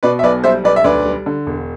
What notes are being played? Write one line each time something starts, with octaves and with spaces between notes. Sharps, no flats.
B2 B4 D5
E5
B1 B4 D5
G3 C5 E5
B1 B4 D5
E5
D2 B4 D5
G3
D3
E1